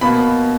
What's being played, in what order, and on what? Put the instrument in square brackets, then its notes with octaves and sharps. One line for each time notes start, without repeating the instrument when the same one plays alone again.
[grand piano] B2 A#3 B5